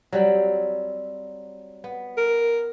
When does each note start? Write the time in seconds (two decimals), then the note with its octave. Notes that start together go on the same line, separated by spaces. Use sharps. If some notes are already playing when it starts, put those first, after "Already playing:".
0.12 F#3 G3 C4
1.84 B3
2.17 A#4